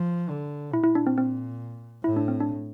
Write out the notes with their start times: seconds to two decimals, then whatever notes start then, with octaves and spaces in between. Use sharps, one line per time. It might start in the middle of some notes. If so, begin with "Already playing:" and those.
Already playing: F3
0.29 D3
0.73 A#2 E4
0.84 E4
0.95 D4
1.07 C4
1.18 C4
2.04 A2 E4
2.16 D4
2.28 C4
2.40 D4